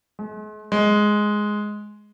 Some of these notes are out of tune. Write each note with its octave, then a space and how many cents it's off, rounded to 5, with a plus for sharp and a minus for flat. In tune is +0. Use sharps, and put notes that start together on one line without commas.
G#3 +40
G#3 +5